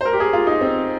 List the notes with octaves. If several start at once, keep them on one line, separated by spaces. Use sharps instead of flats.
C5
A#4
G4
G#4
F4
D#4
C4